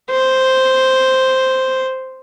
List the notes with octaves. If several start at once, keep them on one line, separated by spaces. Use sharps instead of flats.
C5